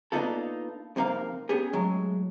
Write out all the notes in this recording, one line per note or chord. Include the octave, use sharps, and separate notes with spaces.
A#3 B3 D4 D#4 F4 A4
F2 C3 E3 A#3 D#4 F5
B3 C#4 G4 G#4
A2 F#3 G#3